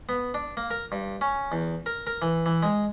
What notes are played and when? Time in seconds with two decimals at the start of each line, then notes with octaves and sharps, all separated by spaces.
0.09 B3
0.34 D4
0.57 A#3
0.71 A#4
0.92 G2
1.21 C#4
1.52 E2
1.86 A#4
2.07 A#4
2.22 E3
2.46 E3
2.63 G#3